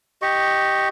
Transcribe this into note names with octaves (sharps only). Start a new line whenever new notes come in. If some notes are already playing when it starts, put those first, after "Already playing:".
G4 D#5 C#6